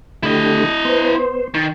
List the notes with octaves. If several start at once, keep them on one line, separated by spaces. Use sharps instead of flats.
D3 A3 E4 G4 D#5
B3 C5
D#3 C#6